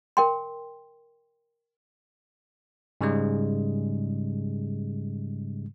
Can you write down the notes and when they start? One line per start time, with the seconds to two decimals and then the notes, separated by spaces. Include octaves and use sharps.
0.17 A#4 G5 C6
3.01 G#2 C#3 G3 G#3